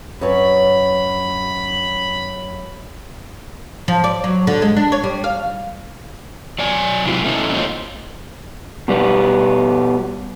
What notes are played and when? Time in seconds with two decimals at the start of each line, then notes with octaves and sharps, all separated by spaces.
0.21 F#2 B4 C#5 B5
3.88 F3
4.04 D5
4.24 F#3
4.47 D3
4.62 G#3
4.76 D4
4.92 C#5
5.04 G3
5.24 F5
6.59 F#3 D5 G#5
7.05 G#2 C3 F#3 C4 E4 F4
7.24 A3 B3 C#4 D#4 E4 A4
7.54 A3 F4 A4 C5 C#5 D#5
8.88 B2 G3 B3